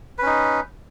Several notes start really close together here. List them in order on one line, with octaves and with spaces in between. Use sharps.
B4 C#4 D#4